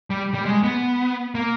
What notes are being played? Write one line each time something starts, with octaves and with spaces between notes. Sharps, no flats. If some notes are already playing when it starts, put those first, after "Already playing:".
G3
G3
G#3
B3
A#3